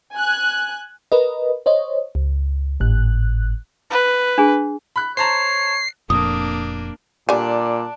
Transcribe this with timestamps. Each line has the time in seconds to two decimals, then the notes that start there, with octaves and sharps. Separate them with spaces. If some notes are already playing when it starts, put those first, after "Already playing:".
0.14 G#5 F#6
1.12 A#4 B4 D#5
1.66 C5 C#5 D#5
2.15 C#2
2.80 G#1 A2 F#6
3.91 B4
4.38 D4 G#4
4.96 B5 F#6
5.17 C5 C#5 A5 A#5 C7
6.10 F1 F2 A#2 A#3 D4 D#6
7.29 A#2 D3 G3 D4 G#5